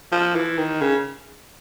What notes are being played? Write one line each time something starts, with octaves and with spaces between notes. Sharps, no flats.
F3
E3
D#3
C#3